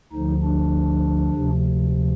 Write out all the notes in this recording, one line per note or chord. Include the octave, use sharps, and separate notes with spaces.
D2 D3 F3 D#4
D4
D2 C3 F3